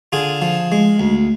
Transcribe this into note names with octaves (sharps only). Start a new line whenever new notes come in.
D3 F4 G#4
F3
G#3
D2